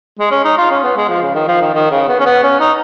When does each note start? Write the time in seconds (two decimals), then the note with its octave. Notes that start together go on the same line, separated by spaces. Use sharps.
0.19 G#3
0.31 C#4
0.44 D#4
0.58 F4
0.71 C#4
0.84 B3
0.97 G#3
1.09 F3
1.23 C#3
1.35 D#3
1.48 F3
1.62 D#3
1.74 D#3
1.91 C#3
2.08 B3
2.20 C#4
2.26 B3
2.43 C#4
2.60 D#4